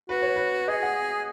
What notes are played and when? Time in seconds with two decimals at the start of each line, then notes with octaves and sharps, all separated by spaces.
0.09 F#4 B4
0.22 C#5
0.36 B4
0.68 G#4 D#5
0.83 F#5